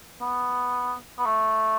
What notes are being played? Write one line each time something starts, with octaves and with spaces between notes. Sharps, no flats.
B3
B3
A3